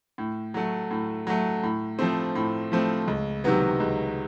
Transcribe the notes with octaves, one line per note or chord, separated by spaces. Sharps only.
A2
F#3 A3
A2
F#3 A3
A2
F3 A3 C4
A2
F3 A3 C4
C#2
C3 D#3 F#3 B3
C#2